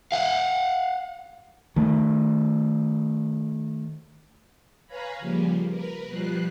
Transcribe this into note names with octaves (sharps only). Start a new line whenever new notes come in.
F5 F#5
D#3 A3
B4 C#5 F5 G#5 A#5 B5
C#3 F3 G3 A#3
A#4 B4
B2 F3 G3 F#6 C7